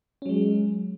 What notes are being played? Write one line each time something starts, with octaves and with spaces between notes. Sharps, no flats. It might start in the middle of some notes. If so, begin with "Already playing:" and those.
F#3 G#3 C#4